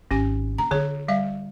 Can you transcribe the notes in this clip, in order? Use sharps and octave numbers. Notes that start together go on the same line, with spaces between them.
G#1 C#4 G4 G#5
D3 A#3 A#5
D3 D#4 F4 G#4 C#5
G3 E5 F5